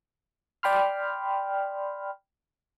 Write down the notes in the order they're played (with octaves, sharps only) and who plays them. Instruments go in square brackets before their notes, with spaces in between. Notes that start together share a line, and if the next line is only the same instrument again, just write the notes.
[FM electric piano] D5 G5 B5 C6 F6